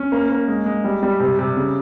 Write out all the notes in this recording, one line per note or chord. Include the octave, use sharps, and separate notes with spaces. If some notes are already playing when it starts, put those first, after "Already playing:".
Already playing: C#4
A#3
A#3
G#3
G#3
G3
G3
C3
C3
C#3